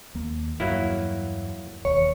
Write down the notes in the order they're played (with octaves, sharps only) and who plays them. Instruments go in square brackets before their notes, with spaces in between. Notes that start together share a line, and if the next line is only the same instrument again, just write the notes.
[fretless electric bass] D#2 A#3
[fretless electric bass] E2 G2 [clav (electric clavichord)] F#3 A#3 E4
[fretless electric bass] E1 D#2 [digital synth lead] C#5